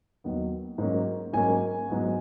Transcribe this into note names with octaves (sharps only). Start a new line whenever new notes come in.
D#2 D#3 F#3 B3
G#2 F#3 A#3 C#4
G#2 F#3 A#3 C#4 G#5
G#2 F#3 B3